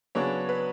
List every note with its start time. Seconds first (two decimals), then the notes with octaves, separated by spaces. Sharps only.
0.15 C#3 F#3 B3 D4 C#5
0.49 B4